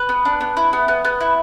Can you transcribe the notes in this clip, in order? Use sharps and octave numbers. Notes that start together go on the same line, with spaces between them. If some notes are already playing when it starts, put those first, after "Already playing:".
Already playing: B4
B3
D4
B3
E4
B3
B3
B3
E4